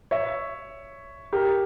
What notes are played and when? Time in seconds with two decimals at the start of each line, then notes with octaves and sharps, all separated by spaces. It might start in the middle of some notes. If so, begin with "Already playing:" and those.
0.11 C#5 E5
1.33 G4 A#4